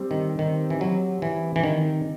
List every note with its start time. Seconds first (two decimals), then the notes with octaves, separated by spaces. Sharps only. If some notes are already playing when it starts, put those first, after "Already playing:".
Already playing: G3 C4
0.11 D#3
0.39 D#3
0.70 E3
0.81 F#3
1.22 E3
1.56 E3
1.64 D#3